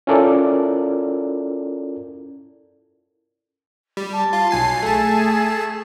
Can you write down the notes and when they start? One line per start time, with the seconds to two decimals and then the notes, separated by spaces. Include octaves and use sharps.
0.07 C#4 E4 F4 A4 A#4 D5
3.97 G3
4.12 A5
4.33 F4
4.51 B1 G#5 C7
4.83 A3 G#4 A5